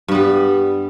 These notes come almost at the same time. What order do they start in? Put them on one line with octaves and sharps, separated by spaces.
G2 B3 G3